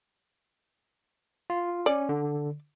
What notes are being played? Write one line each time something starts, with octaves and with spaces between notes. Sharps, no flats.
F4
C#4 D5
D3